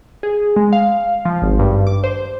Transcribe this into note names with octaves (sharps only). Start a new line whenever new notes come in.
G#4
G#3
F5
F3
G#1
G2
D6
C5